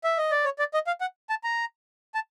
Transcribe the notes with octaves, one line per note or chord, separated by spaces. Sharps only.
E5
D#5
D5
C#5
D5
D#5
F5
F#5
A5
A#5
A5